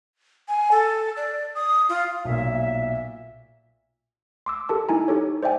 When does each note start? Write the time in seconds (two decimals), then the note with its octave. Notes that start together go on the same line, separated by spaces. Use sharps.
0.48 G#5
0.71 A4
1.17 D5
1.55 D#6
1.89 F4
2.25 B1 A#2 E5
4.46 C6 D6 E6
4.69 G4 A4 A#4 A5 E6
4.89 D#4 E4 G#5 A#5
5.08 D#4 G4 A4 C#5
5.43 C5 D5 E5 G5 G#5